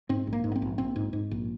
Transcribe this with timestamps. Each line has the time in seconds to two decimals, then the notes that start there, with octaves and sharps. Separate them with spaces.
0.09 G#2 C4
0.27 A#1
0.33 A#3
0.44 G#2
0.52 B3
0.56 C4
0.62 A#1
0.78 A#1 C4
0.96 G#2
1.13 G#2
1.31 A#1